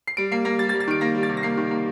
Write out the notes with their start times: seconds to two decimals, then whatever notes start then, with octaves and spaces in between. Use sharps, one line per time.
0.07 C7
0.17 G3 D7
0.32 A#3 C7
0.45 A#3 A#6
0.59 G3 A6
0.69 A6
0.74 G3
0.80 A6
0.88 D#3 D7
1.01 A#3 A#6
1.15 G3
1.23 A6
1.29 C3
1.37 A#6
1.43 A#3 C7
1.57 D#3
1.71 A#3